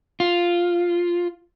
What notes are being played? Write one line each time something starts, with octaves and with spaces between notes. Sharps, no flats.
F4